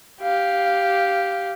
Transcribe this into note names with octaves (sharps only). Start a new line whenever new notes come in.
G4 F5